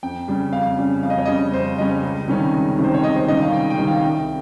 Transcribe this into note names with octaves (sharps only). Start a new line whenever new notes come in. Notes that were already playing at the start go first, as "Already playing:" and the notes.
F2 G5
C#3 G3 C#4
F2 F5
C#3 G3 C#4
F2 F5
D#5
C#5
C#3 G3 C#4 D#5
F2 C5
C#3 G3 C#4 D#5
C#2
C3 D#3 G3 C#4
C#2
C3 D#3 G3 C#4
C5
C#5
C#2 D#5
C5
C3 D#3 G3 C#4 D#5
F5
C#2 G5
G5
C3 D#3 G3 C#4
F5
C2 G5